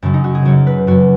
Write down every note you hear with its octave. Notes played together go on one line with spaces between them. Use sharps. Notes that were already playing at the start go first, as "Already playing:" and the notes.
F#2 C#3 F#3 C#4
D#4
F#4
G#4
F#2 C#3 F#3 C#5
B4
F#2 F#3 F#4